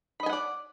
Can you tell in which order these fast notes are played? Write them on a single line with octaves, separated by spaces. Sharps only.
B5 D#5 G#5 F#5 D5